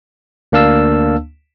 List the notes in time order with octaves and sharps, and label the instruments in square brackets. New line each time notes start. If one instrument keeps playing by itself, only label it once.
[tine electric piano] D2 A#3 D4 F5 A5 E6